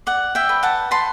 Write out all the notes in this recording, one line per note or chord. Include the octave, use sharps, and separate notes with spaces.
D5 F#5
E5 G5
B4
F#5 A5
B4 A5 C6